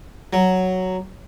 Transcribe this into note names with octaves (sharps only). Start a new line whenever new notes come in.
F#3